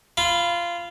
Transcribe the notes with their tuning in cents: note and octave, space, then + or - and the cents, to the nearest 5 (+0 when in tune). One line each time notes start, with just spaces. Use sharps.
F4 -15 B5 +0